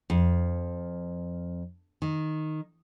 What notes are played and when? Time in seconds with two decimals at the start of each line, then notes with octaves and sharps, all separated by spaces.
0.10 F2
2.02 D#3